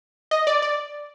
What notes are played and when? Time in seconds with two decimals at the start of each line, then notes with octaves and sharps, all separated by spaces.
0.31 D#5
0.47 D5
0.62 D5